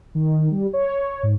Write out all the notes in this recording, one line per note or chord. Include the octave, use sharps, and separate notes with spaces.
D#3
G3
C#5
G#2